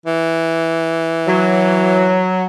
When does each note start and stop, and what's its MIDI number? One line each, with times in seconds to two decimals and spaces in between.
0.06 2.28 52
1.27 2.46 54